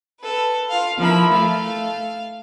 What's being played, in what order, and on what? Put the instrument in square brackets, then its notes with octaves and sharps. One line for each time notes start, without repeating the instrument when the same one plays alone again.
[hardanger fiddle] A4 B4
F4 F5
[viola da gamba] F3 E4 [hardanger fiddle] A#4 B5
[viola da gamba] A3 [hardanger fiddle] F5